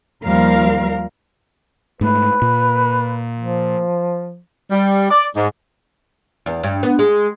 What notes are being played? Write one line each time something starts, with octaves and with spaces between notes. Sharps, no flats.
D#2 F3 G3 A#4 F5
G#2 A3 B4
A#2
F3
G3
D5
G#2
E2
G2
B3
G#3